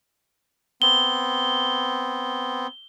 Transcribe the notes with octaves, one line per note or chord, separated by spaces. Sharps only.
B3 C4 G7